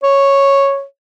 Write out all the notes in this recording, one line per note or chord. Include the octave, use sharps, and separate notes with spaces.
C#5